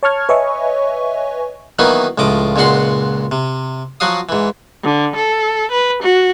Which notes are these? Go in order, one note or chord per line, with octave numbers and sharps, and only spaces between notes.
C#5 A5 C#6 F6 G#6
B4 C#5 D#5 E5 G#5 C#6
D#3 E3 F#3 A#3 B3 D#4
C#2 A2 F3 D#5 D6
C#2 A#2 G#3 F#4 F#5 C6
C3
F3 F#3 F#4 F5 D#6
G#2 E3
D3
A4
B4
F#4